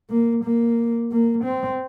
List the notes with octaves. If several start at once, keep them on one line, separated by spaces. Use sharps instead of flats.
A#3
A#3
A#3
C4